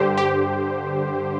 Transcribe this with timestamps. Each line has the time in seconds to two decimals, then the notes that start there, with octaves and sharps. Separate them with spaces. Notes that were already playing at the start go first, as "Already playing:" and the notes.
Already playing: G2 D3 G4 C5
0.17 G4